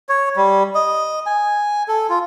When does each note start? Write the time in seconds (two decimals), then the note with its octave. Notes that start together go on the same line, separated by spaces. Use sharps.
0.09 C#5
0.36 G3
0.75 D#5
1.26 G#5
1.88 A4
2.10 F4